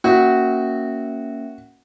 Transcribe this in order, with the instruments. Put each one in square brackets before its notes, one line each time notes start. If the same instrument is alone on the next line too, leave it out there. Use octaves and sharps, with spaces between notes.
[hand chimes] A#3 C#4 E5 [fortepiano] F#4